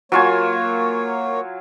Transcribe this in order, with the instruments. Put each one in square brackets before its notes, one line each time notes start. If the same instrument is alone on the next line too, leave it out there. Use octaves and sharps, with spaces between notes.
[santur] F#3 F4 G#5 [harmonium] A#3 C#5